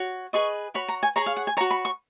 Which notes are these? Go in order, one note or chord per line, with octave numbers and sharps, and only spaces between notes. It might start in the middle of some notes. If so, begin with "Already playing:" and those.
Already playing: F#4 C#5
G#4 B4 D#5 C#6
F#4 C#5 B5
A#5
G#5
G#4 C#5 A#5
F5
F#5
G#5
F#4 C#5 A#5
B5
C#6